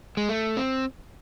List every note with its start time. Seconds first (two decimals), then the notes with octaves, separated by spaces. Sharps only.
0.17 G#3
0.29 A3
0.57 C4